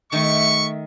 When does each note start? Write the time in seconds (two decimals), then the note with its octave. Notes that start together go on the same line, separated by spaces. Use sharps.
0.12 D#3 A3 E5 C#6